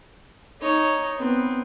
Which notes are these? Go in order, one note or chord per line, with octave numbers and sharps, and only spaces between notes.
D#4 C#5
B3 C4